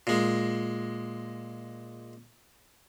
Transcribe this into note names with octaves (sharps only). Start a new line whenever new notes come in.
A#2 G#3